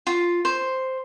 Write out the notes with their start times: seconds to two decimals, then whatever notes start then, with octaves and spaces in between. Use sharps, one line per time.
0.07 F4
0.45 C5